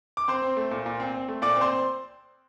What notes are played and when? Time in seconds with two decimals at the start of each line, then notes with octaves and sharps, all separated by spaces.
0.17 D6
0.28 C4 C5 C6
0.42 C4
0.57 A3
0.71 A#2
0.86 A#2
1.00 C4
1.14 C4
1.28 A3
1.42 A#2 D5 D6
1.56 C4
1.61 C5 C6